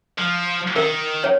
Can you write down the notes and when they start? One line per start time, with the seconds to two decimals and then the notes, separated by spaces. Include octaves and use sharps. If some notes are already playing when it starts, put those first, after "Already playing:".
0.18 F3
0.76 D#3 A#4
1.24 C#5